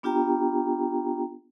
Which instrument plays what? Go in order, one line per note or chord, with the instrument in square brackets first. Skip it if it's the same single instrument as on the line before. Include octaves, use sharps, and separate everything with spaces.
[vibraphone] B3 D4 F4 G4 G5 A#5